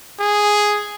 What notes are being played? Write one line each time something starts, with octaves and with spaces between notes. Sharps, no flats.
G#4